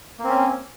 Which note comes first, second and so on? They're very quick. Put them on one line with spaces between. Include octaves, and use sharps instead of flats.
A#3 C4 C#4